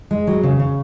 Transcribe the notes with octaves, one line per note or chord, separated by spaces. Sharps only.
G#3
F#3
C#3
C#3